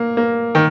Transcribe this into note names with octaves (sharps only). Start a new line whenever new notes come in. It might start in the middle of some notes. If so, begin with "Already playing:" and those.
Already playing: A#3
A#3
D#3